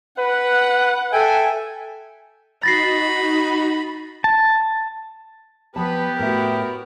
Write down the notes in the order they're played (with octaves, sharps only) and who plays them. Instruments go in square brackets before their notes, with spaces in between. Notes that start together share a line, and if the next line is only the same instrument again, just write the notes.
[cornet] B4 [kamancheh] F#5
[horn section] A4 G5 G#5 [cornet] E5
[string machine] D#4 F#4 [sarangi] B5 [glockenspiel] A6 A#6 C7
[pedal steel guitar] A5
[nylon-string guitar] F3 A5 [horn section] B3 [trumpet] G4 [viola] B4
[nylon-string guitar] A2 E5 [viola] F#4 A#4